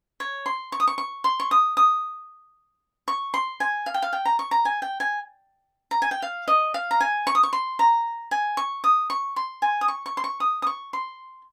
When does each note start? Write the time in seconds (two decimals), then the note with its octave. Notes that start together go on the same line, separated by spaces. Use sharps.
0.20 C#5
0.46 C6
0.72 C#6
0.80 D#6
0.87 C#6
0.98 C#6
1.24 C6
1.40 C#6
1.51 D#6
1.77 D#6
3.08 C#6
3.34 C6
3.60 G#5
3.86 F5
3.94 G5
4.02 F5
4.13 G5
4.25 A#5
4.39 C#6
4.51 A#5
4.65 G#5
4.82 G5
5.00 G#5
5.91 A#5
6.02 G#5
6.11 G5
6.22 F5
6.48 D#5
6.74 F5
6.91 A#5
7.00 G#5
7.27 C#6
7.35 D#6
7.43 C#6
7.53 C6
7.79 A#5
8.31 G#5
8.57 C#6
8.84 D#6
9.10 C#6
9.36 C6
9.62 G#5
9.81 D#6
9.88 C#6
10.06 C#6
10.17 C6
10.24 C#6
10.40 D#6
10.62 D#6
10.67 C#6
10.93 C6